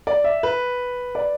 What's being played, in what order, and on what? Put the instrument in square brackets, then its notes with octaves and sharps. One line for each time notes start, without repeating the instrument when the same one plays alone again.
[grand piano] D5
E5
B4
D5